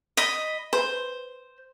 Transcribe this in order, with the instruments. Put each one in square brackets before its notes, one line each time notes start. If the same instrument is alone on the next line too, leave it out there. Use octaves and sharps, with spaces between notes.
[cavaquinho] D#5 B5
[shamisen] B4 [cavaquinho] C5